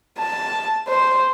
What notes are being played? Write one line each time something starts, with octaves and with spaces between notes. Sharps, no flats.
A5
C5